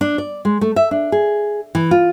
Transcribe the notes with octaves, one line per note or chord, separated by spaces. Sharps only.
D4
D5
G#3
A3
E5
D4
G#4
E3
F4